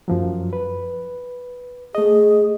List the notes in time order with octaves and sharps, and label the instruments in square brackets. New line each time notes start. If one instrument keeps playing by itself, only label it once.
[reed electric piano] F#2 F3 F#3
B4
[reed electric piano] A3 D#5 [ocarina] G#4